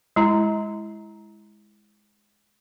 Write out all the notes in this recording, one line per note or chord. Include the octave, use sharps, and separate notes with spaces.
G#3 E4 A#5